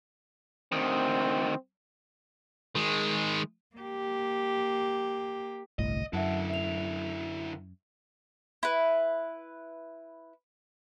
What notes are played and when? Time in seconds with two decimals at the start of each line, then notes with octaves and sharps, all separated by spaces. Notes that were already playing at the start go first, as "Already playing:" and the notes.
0.72 D2 D#3 C4
2.75 D#3 G#3
3.76 A#3 G4
5.79 G1 C2 A2 D#5
6.13 F#2 D3 E4 E5 F#5 A5
6.49 E5 F7
8.63 E4 B4